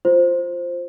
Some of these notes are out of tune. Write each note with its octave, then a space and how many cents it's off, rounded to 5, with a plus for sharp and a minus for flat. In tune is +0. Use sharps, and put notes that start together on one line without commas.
F4 +0 C5 +5